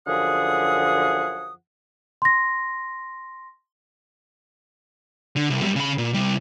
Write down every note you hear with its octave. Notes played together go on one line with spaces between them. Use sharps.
F#2 D3 F3 G#4 F#5 D#6
C6 A#6
D3
C2
F#2 G3
C#3 B5
A#2
C2 G3